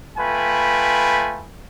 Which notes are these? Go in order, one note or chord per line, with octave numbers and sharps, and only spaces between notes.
A3 F4 B4 G5 G#5 B5